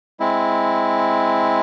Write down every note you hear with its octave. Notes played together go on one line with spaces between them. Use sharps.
G#3 C4 E4